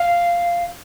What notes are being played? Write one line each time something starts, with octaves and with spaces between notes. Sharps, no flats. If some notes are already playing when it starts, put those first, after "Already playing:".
Already playing: F5